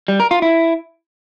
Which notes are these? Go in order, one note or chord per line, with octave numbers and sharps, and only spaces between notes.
G3
A#4
F4
E4